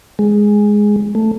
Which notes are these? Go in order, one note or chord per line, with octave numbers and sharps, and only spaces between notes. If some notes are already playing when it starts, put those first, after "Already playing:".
G#3
A3